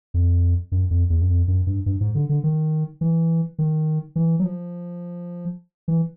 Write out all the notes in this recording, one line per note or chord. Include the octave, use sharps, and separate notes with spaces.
F2
F#2
F2
E2
F#2
F2
F#2
G2
G2
G#2
D3
D3
D#3
E3
D#3
E3
F#3
F3
E3